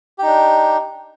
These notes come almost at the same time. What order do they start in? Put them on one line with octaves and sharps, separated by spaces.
G4 D#4 D4